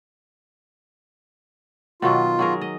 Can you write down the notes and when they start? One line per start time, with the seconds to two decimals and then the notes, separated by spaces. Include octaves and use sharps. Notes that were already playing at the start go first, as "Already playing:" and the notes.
2.02 B2 D#3 F#3 F4
2.39 F#3 G#4 A#4
2.61 D#5